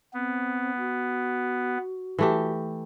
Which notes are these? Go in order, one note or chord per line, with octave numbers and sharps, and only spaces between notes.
B3 C4
F#4
E3 A3 G4